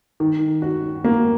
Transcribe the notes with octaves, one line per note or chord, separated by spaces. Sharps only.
D#3
F#4
A#3